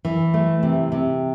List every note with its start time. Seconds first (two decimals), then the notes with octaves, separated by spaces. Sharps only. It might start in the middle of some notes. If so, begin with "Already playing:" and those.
0.05 E3
0.34 A3
0.63 C3
0.92 C3